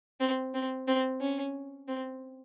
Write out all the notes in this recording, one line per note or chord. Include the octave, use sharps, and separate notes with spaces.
C4
C4
C4
C#4
C4